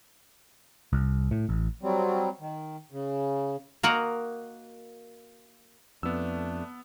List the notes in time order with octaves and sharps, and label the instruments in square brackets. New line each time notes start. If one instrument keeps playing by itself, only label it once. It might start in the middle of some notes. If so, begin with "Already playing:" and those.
[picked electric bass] C2
A2
A1
[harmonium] F#3 G3 C4
D#3
C#3
[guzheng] A#3 F#4 A#4 D#5 F#5
[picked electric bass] F2 [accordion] A3 D4 [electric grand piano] B3 E6